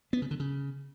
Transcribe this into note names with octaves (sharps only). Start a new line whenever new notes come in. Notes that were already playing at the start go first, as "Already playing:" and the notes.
B3
C#3
D3
C#3